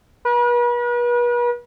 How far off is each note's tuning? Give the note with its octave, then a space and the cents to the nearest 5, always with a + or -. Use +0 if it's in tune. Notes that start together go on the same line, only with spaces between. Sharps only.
B4 -40